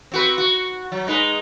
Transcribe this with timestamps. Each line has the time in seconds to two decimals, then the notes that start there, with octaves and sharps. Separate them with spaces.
0.12 C4 F#4 B4
0.38 F#4
0.92 F#3
1.07 G#3 D#4 B4